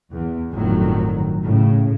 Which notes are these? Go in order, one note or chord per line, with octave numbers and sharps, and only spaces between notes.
E2
G1 F2 A2 D#3 F#3
A2 C#3